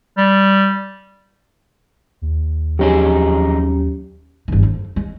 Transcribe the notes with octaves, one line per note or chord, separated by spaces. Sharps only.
G3
D#2
F2 F#3 C#4 D#4 G4 G#4
G1 D#3
F2
G#3